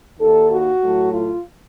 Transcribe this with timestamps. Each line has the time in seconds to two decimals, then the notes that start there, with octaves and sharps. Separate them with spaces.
0.19 D#2 D#3 A#3 A4
0.51 F#4
0.82 A2 F#3 A3
1.13 F4